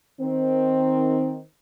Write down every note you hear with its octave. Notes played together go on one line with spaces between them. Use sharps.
D#3 C4